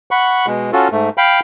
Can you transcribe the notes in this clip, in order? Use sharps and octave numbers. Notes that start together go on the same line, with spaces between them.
F#5 B5 C#6
B2 G#3
C#4 F4 F#4 A4
G#2 A3
F5 G5 B5